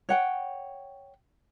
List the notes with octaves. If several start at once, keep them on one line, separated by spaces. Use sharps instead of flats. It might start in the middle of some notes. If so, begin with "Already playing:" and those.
C#5 F#5 G5